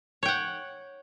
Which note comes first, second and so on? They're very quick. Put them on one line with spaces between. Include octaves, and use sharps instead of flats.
C#5 G5 F#5